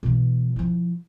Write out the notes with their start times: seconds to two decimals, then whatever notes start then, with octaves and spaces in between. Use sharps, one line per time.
0.03 B2 E3
0.56 F3 E4